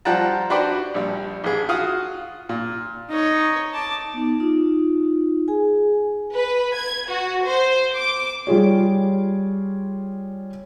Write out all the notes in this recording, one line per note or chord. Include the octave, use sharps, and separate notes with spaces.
F3 G3 F#5 G5 A5 A#5
D4 F#4 G4 B4 C5 D5
A#1 G3
A1 G#4
F4 F#4 F5 D#6
A#2
D#4 C#5
A5 D6
B3 D#4
D#4 F4
G#4 G#5
B4
G#6
F#4
C5
D6
G3 F4 G#4 C#5